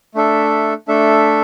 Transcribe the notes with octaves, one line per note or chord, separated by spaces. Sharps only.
A3 D4 A4 E5
A3 D4 A4 E5